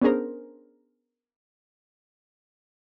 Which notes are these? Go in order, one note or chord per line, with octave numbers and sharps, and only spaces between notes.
B3 C#4 D4 G#4 A#4 C5